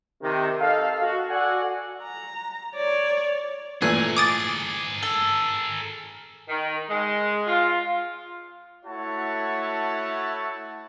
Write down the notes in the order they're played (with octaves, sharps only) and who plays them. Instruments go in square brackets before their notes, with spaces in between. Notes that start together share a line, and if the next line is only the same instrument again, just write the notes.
[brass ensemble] C3 D#3
A4 D#5 F5
F#4
F#4 A4 D5 F#5 G#5
[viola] A#5
C#5 D5
[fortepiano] A#2 E3 A3 [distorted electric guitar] G#4 A#4 [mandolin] G#5 F#6
[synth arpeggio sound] D6 D#6 A6
[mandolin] A4
[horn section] D#3
G#3
F4
[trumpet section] A3 E4 F#4 C#5 F#5 A5